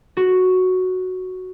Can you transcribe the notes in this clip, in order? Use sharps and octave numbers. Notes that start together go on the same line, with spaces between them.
F#4